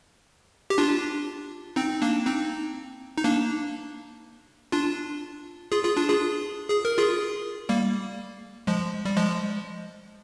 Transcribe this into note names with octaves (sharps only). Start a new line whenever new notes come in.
G4
D4 F4
C4 D#4
A#3 D4
C4 D#4
D#4
A#3 D4
D4 F4
F4 G#4
F4 G#4
D4 F4
F4 G#4
G#4
A#4
F4 G#4
G3 A#3
F3 G#3
G3
F3 G#3